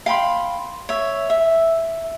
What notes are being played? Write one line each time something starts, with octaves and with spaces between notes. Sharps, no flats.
F5 G5 B5 C6
C#5 E5
E5